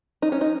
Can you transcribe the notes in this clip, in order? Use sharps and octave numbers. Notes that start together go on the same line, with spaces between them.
D#4
C#4
D#4